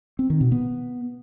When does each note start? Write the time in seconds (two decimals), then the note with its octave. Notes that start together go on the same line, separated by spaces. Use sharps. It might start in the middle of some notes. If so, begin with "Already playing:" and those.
0.19 C4
0.30 D#3
0.41 B2
0.52 B3